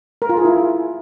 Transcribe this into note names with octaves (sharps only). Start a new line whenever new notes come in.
A#4
F4
G#4
E4